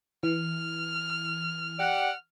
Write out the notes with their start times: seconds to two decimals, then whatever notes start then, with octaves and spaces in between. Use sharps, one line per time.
0.23 E3 F6
1.79 G4 D5 F#5